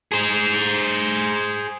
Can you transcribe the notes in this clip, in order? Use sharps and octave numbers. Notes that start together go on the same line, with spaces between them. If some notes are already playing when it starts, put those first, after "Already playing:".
G#4 C5